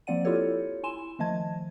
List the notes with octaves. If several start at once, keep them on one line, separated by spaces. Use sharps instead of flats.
F3 A#3 C4 D5 F#5 D#7
E4 F4 G4 A4 C#5
E4 G#5 C6 E7
D#3 F3 A3 D#5 A5 G#6